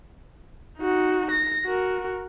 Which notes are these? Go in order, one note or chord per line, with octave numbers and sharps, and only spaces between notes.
D#4 F#4
A#6
F#4 A#4